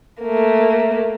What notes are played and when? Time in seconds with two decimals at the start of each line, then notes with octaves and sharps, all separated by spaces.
0.22 A3 A#3